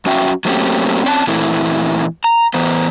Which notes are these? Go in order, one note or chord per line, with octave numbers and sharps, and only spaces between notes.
F#2 C#4 F#4 E5 G5
F#3 A3 A#3 C4 C#4 G4
C4 C#4 A5
A#2 E3 A3 C4 E4
A#5
E3 B3 C5